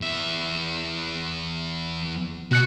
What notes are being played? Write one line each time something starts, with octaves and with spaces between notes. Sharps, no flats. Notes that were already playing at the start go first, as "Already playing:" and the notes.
E2 E5
B2 F#4 F#6 C#7